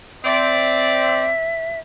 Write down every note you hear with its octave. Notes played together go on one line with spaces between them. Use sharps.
C4 D5 E5